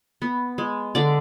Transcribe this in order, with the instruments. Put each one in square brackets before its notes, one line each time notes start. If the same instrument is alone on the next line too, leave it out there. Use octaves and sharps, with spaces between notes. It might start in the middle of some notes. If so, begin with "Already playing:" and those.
[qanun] B3
G#3
D3 D5